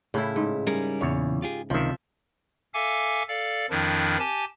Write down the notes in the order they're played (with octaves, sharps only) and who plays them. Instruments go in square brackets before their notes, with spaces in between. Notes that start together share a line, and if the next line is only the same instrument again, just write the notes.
[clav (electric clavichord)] A2 [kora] C#3 E4
[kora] G#2
[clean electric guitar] G3 C#4 A#4 [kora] G#4
[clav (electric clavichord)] E2 C#5 [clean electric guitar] A#2 C#3 E3
[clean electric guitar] F4 G4 G#4
[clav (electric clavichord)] C#2 D#3 [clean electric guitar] C3 [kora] F3 E5
[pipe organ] A4 E5 F5 G#5 D6
A4 D5 F5
F2 D#3 F3 D4 E4
G4 G#5 A5